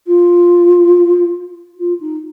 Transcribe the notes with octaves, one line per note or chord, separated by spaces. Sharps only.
F4
F4
D#4